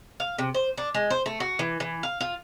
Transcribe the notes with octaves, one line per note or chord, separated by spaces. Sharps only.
F5
C3
C5
D4
G#3
C5
A3
F#4
E3
E3
F5
F4